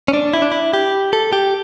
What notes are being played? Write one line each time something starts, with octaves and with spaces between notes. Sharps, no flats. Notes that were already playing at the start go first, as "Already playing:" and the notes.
C#4
D4
E4
D4
E4
G4
A4
G4